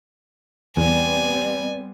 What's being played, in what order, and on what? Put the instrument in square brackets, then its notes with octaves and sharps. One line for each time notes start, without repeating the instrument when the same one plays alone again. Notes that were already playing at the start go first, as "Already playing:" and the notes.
[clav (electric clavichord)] E2 [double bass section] G3 B3 C4 [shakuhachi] D5 [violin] G#5